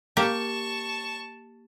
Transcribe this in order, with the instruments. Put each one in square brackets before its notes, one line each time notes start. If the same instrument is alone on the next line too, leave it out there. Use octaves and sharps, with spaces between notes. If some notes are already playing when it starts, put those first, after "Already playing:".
[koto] A#3 G4 [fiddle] A5 C#6